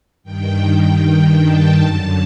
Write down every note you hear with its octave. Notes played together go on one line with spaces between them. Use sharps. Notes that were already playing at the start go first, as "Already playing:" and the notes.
G2 D#3 G5
G5
A5
F#2 D3